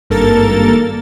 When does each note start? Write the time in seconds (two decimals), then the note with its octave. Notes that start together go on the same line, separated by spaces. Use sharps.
0.10 G#1 G2 A#3 A4 A#4 A6